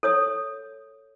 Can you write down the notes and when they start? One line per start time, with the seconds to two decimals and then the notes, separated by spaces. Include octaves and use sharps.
0.03 A4 C#5 D#6